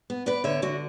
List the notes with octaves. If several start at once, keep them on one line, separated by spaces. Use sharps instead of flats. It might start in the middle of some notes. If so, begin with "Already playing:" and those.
B3
B3 B4 D5
D3 C#5 E5
D3 F#4